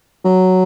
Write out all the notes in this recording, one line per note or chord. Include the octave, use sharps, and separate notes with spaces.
F#3